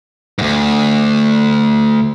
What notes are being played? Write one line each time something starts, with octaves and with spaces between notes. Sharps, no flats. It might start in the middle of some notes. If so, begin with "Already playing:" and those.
D2 G#2